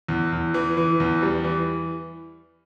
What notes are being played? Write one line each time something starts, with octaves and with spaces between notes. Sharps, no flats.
E2
E2
E3
E3
E2
G3
E3